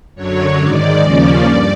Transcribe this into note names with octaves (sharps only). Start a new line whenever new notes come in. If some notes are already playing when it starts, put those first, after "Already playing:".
F#2 D3 F#3 C#5
G#2 D#3 G#3 D5
D#2 C#3 F3 A#3 C#4 D5
G2 D5